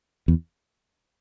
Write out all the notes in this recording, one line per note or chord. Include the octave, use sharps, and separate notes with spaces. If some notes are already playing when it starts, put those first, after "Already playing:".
E2